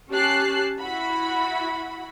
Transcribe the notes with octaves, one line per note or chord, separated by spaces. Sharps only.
C#4 G4 A5 F#6 C7
E4 F#4 B5